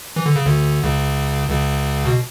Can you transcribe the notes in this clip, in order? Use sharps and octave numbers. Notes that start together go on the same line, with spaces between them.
E3
D3
C#3
D2 D3
C#2 C#3
C#2 C#3
B2